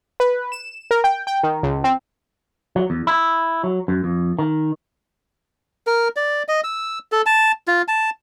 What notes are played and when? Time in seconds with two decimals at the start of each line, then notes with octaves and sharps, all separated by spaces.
0.20 B4
0.52 E7
0.91 A#4
1.04 G5
1.27 G5
1.43 D#3
1.63 C#2
1.84 C4
2.76 F#3
2.90 E2
3.07 E4
3.64 F#3
3.88 F#2
4.04 F2
4.39 D#3
5.87 A#4
6.16 D5
6.48 D#5
6.64 E6
7.12 A4
7.26 A5
7.67 F4
7.88 A5